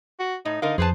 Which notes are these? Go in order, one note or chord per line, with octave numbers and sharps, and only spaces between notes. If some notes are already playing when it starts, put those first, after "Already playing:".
F#4
A2 D#4
D3 D#4 A#4 F5
F2 G#4 B4 C5 A5